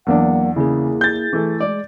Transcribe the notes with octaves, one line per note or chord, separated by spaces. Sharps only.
E2 F#3 A#3 D4 F#5
C#3 A#3 E4 G#4
G6 A6
E3 A3
G#3 D5